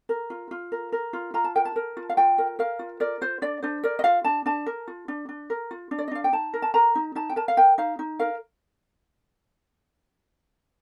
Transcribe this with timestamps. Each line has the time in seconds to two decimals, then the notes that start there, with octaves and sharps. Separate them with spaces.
0.09 A#4
0.30 F4
0.51 F4
0.72 A#4
0.92 A#4
1.13 F4
1.34 F4 A#5
1.44 A5
1.55 A#4 G5
1.65 A5
1.76 A#4
1.97 F4
2.09 F5
2.17 F4 G5
2.38 A#4
2.59 A#4 F5
2.79 F4
3.00 A#4 D5
3.21 F4 C5
3.42 D4 D5
3.63 D4 C5
3.83 A#4 D5
3.99 D#5
4.04 F4 F5
4.24 D4 A5
4.46 D4 A5
4.66 A#4
4.88 F4
5.08 D4
5.29 D4
5.50 A#4
5.71 F4
5.91 D4
5.98 D5
6.08 D#5
6.11 D4 F5
6.24 G5
6.33 D#4 A5
6.54 A#4
6.62 A5
6.74 A#4 A#5
6.95 D#4
7.15 D#4 A5
7.29 G5
7.36 A#4 A5
7.48 F5
7.57 A#4 G5
7.78 D#4 F5
7.99 D#4
8.19 A#4 F5